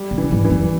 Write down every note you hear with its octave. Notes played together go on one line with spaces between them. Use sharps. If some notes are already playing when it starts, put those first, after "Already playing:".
Already playing: G3
C3
E3
G#2
E3
F#2